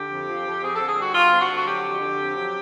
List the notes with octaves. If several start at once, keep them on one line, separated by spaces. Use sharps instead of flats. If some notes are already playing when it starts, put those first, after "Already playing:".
Already playing: D3 G4
F2
F3
F2
C4 G#4
D3 A4
G#4
G3 F#4
D3 F4
C4
F#4
D3
F#4
F#3 G4
F2
D3
F2
F#3